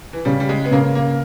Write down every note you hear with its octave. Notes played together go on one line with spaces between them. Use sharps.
E3
C#3 G3
G3
G#3
B3
C#3 A#3
A#3